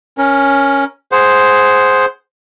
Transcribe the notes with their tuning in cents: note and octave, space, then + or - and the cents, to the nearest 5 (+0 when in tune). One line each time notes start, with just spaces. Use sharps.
C#4 +0 A#4 +10
G#4 +0 C5 +0 F#5 +15